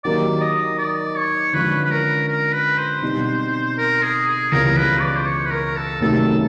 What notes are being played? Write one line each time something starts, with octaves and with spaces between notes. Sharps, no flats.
D#3 F#3 A#3 D#4 G4 D5
D#5
D5
C#5
D3 F3 G#3 C#4 B4
B4
A#4
A#4
B4
C5
B2 G3 C4 D#4
A#4
G#4
G#4
C#2 C#3 E3 G3 B3 A#4
B4
D5
C5
C#5
B4
A#4
A4
C3 D#3 F#3 A3 C#4 A4